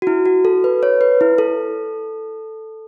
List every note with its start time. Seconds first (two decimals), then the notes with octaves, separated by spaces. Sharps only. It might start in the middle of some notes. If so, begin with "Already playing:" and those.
0.02 F#4
0.07 E4
0.26 F#4
0.45 A4
0.64 B4
0.83 C#5
1.01 B4
1.21 E4
1.38 A4